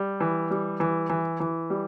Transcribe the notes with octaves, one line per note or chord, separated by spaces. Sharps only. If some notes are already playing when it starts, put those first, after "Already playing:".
Already playing: G3
E3
G3
E3
E3
E3
G3